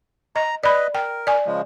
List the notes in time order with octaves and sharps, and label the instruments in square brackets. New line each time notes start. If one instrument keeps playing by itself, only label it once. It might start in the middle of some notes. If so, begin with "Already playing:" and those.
[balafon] D#5 [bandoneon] A#5
[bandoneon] B4 D#5 [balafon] D5 B5
[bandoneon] A#4 [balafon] G5
[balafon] D5 G#5
[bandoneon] C#3 F3 G#3